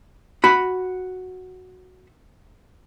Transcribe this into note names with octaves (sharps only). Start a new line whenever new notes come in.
F#4 B5